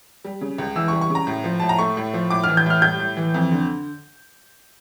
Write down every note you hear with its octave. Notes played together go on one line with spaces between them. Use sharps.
G3
C#3
C#2
E3 E6
G3 C#6
C#6
C#3
A#5
A2
F3
A2 A5
A#5
A3 C#6
A2
F3
A2 D6
F6
E3
G6
A2 F6
G3 G6
A2
E3
F2
D3